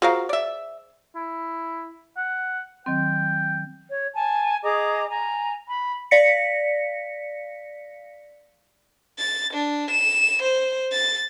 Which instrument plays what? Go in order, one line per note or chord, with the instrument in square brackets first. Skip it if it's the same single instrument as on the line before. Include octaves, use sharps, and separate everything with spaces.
[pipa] F4 F#4 A#4 [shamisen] G#4 C5 F5
[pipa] D5 E5
[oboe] E4
F#5
[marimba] D#3 F#3 C4 [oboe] G5
[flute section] C#5
G#5 A5
G#4 D#5 A#5 D6
G#5 A#5
B5
[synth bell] D5 F5 A#6 B6 C#7
[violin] A6
D4
E7
C5
A6